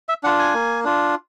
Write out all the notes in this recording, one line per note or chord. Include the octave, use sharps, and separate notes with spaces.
E5
D4 F4 F#5
G#5
A#3
D4 F4